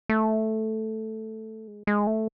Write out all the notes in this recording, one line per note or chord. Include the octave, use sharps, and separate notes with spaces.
A3
G#3
G#3
A3